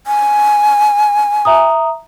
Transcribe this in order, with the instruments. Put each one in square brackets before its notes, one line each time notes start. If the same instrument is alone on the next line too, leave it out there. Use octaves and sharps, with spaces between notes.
[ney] G#5
[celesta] E5 A#5 D#6